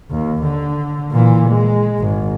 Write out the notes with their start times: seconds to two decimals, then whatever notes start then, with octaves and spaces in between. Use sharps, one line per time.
0.10 D#2
0.43 D3
1.11 A#2 E3
1.48 G#3
1.99 G#1